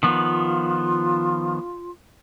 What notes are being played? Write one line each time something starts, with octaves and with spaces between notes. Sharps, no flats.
D#3 F3 B3 F4